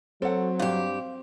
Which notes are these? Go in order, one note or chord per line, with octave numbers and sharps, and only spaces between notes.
F#3 C4 A4 F#5
G2 G4 F5